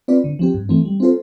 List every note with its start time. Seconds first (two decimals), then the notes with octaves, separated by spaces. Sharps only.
0.08 C4 F4 B4 D5
0.24 D3
0.39 F3 C4 G4
0.54 G2
0.69 E3 A3 C4
0.85 G3
1.00 C4 F4 A4 C5